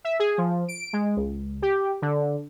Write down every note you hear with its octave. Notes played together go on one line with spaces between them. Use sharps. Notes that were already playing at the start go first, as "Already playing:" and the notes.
E5
G#4
F3
D7
G#3
C#2
G4
D3